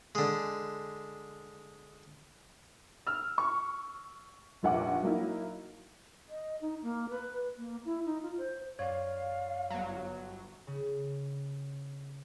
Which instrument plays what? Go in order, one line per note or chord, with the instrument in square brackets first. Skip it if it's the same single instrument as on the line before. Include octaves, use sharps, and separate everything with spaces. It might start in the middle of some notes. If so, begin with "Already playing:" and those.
[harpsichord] D3 G#3
[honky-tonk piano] E6 F6
C#6
F1 A#1 F#5 D6
F#3 A#3 D#4 E4
[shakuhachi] D#5
D#4
A#3
B4
A#3
E4
D#4
F4
C5
[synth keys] F#2 D5 [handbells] C#5 [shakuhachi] F5
[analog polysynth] G1 F#3
[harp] C#3